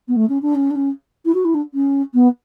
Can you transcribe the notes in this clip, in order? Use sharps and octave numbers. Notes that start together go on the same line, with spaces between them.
B3
A3
C#4
D4
C#4
D4
C#4
E4
F#4
E4
D4
C#4
B3